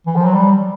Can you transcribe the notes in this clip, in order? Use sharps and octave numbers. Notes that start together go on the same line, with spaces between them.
E3
F3
F#3
G3